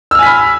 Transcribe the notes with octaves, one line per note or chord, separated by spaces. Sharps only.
G#5 B5 E6 F6 B6